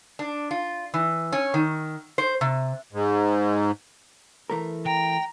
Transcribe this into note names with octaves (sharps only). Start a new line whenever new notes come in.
D4
F4
E3
C#4
D#3
C5
C3
G#2
E3 A3 A#4
G5 A#5